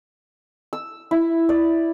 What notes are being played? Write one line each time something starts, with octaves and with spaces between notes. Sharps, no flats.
E6
E4
D5